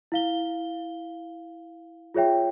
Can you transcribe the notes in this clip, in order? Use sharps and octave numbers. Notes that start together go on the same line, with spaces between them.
E4 F5 G7
F4 G#4 C#5 E5 G5